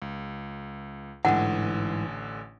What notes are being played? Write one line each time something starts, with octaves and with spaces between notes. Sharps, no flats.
C#2
A1 G#2 D3 E3 F#5 G#5